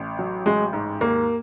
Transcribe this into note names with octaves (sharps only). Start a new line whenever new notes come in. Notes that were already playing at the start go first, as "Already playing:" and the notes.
Already playing: A1
F#3
A1 G#3
G#2
D#2 A#3